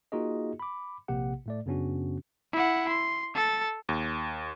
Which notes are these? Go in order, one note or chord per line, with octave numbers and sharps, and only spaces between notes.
A#3 D#4 F4 F#4 G#4 D#5
B5 D6
A#1 C3 A#3 G4 F#5
A2 A3 D5
F#2 C#3 B3 C#4 D4 F#4
E4 F#5
C6
A4 A6
D#2